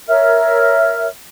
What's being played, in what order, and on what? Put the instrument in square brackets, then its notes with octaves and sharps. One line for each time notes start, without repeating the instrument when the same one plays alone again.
[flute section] A#4 C#5 E5 F6